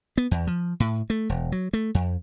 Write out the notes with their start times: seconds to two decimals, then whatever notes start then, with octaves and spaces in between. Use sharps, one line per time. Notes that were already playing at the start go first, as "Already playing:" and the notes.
0.18 B3
0.31 E2
0.47 F3
0.80 A2
1.10 A3
1.29 E1
1.52 F#3
1.73 A3
1.95 F2